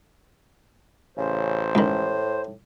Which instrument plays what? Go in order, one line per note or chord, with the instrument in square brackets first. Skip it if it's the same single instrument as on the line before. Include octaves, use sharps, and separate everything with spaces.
[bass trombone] A1 [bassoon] C#3 [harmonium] C5
[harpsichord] C#2 D#3 [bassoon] A2